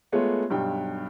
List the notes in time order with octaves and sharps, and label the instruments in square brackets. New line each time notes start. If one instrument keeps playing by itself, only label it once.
[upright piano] G#3 A3 B3 F4 C#5
B1 G2 G5